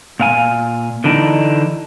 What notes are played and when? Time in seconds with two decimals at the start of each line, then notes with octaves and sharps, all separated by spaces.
0.20 A#2 F5 G#5
1.04 D3 E3 D4 D#4